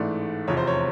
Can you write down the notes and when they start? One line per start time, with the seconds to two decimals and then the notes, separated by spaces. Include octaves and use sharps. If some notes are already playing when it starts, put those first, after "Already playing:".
Already playing: A1 G#2 E3 A3 D5
0.48 F1 E2 C3 F3 C#5
0.57 C5
0.67 C#5